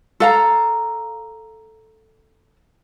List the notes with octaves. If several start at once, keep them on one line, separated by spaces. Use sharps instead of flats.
A4 F5 A#5